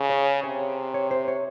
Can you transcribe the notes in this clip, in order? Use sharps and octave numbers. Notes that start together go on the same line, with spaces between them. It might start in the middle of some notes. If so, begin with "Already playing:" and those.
Already playing: C#3
C#5
C3 C#5
C#5
C5
C#5